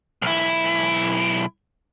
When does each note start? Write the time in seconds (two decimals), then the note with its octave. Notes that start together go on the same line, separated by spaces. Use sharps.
0.22 B1 E4